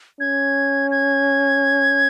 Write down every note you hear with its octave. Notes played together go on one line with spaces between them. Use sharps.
C#4 G#6
G#6